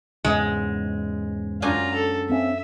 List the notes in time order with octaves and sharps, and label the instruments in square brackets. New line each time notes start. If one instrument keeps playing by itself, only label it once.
[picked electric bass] E2 G#2 C#3 [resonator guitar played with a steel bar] G#3
[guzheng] F#2 D4 G#5 [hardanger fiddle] F4 A#5
[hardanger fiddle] A4
[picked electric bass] A#3 C4 C#4 [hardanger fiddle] E5